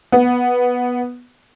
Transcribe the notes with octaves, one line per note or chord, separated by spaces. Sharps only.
B3